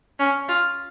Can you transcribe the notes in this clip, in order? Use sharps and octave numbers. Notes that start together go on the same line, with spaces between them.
C#4
F4